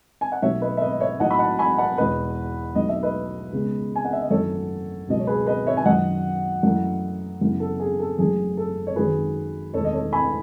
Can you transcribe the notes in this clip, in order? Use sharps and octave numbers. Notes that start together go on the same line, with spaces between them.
G#5
F#5
B1 B2 A3 C#5 E5
B4 D#5
E5
B4 D#5
D#5
C#5 E5
B1 A2 F#3 D#5 F#5
B5
F#5 A5
G#5 B5
F#5 A5
E1 E2 B2 B4 D#5
B1 B2 A3 D#5
E5
B4 D#5
C#2 C#3 G#3 B3
G#5
F#5
E5
D#5
G#1 F#2 E3 A3 A4 C#5
C#2 B2 F#3 D#5
C#5
G#4 B4
B4 D#5
C#5 E5
G#5
F#2 D#3 F#3 D#5 F#5
F#2 E3 A3
F#2 C#3 E3 B3
A4
G#4
A4
F#1 F#2 E3 A3 G#4
A4
C#5
G#1 F#2 D#3 F#3 G#4 B4
E1 E2 D#3 A3 A4 C#5
D#5
A4 C#5
G#5 B5